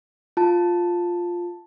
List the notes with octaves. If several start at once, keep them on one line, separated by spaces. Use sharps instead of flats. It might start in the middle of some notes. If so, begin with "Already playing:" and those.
F4 A5